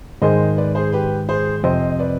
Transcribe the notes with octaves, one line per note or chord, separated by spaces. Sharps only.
G#2 D#3 G#3 C5 D#5
B4 D5
G#4 C5
G4 B4
G#4 C5
F2 C3 F3 C4 C5 D#5
D#5
B4 D5